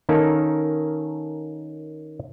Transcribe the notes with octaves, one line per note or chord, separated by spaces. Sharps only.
D#3 A#3 C#4 D#4 A4 A#4